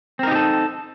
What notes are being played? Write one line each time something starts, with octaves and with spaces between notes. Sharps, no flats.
C4 D#4 G4 A4 A#4